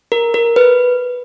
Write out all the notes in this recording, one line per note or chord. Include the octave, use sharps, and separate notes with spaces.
A#4
A#4
B4